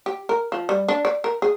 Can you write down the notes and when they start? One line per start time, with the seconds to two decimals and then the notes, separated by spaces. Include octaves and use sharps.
0.06 G4
0.29 A#4
0.52 F3
0.69 G3
0.88 D4
1.05 D5
1.24 A#4
1.42 G#4